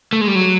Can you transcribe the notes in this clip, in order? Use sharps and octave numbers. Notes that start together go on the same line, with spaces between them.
A3
G#3
G3
F#3